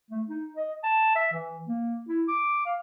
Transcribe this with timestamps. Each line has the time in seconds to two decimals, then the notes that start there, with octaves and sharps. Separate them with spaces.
0.11 A3
0.28 D#4
0.57 D#5
0.84 A5
1.16 E5
1.33 E3
1.68 A#3
2.09 E4
2.28 D6
2.66 F5